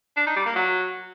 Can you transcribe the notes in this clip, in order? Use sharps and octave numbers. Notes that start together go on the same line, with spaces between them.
D4
D#4
G3
A#3
F#3